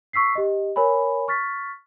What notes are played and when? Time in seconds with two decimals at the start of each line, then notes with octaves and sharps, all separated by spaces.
0.13 C#6 E6 B6 C7
0.35 G4 D#5
0.76 A#4 C#5 G#5 B5
1.28 C#6 F6 A6 B6